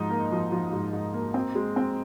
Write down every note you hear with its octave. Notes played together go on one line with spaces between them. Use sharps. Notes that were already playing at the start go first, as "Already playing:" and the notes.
Already playing: G#2 F3 D#4
A#3
F3
F3
G#2
G#2
A#3
C4
G#3
C4